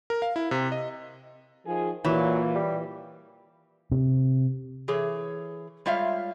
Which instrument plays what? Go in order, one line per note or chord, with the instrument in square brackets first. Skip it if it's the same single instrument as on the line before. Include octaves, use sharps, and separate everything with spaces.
[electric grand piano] A#4
F5
E4
C3
D#5
[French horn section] D#3 F3 G#4
[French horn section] A#2 [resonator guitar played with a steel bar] E3 [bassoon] F#3
[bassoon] G3
[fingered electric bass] C3
[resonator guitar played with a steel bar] E3 G#4 C#5
G3 G#3 F4 C#5 E5 F5